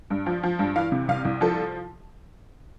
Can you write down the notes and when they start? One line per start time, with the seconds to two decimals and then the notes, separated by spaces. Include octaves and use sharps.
0.10 G2
0.26 F3
0.43 F3
0.59 G2
0.76 E3 F5
0.92 C3
1.08 C2 F5
1.25 C2
1.41 F3 A4